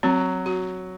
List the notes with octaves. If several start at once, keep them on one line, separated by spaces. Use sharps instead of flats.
F#3 C4
F#4